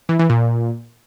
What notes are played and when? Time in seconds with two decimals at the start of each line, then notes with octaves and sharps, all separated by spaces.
0.09 E3
0.19 E3
0.30 A#2